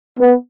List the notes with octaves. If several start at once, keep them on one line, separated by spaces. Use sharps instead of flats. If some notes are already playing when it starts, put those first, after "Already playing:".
B3